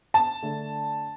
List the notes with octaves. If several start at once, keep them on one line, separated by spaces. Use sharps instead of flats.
A5
D3 A3 D4